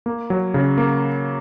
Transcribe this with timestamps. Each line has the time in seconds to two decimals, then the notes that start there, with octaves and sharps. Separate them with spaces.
0.06 A#3
0.30 F#3
0.54 C#3
0.78 A#3